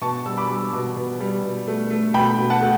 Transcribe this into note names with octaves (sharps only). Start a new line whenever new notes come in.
B2 A5 C#6
G3 E6
B5 D6
G3
B2
B2
G3
B2
A3
A3
B2 G5 B5
B2
F#5 A5
A3